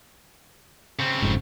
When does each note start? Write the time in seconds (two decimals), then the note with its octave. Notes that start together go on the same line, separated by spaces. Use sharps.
0.99 C#3 C4
1.22 F#1 F2 G#2